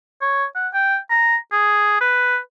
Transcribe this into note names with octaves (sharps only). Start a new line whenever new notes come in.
C#5
F#5
G5
A#5
G#4
B4